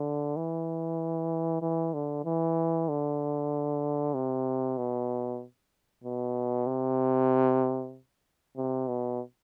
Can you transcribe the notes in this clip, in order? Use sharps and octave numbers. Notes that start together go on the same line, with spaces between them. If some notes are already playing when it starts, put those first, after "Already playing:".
Already playing: D3
E3
E3
D3
E3
D3
C3
B2
B2
C3
C3
B2